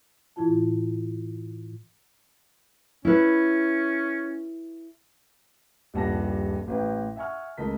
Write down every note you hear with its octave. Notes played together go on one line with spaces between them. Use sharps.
A2 E3 E4 F4 A5
C#4 E4 B4
D#1 A#1 G2 F#5 A5 A#6
A1 B4 G5
E5 F#5 G#5 C#6 F6
C#2 A3 A#4 D#5 A5 B6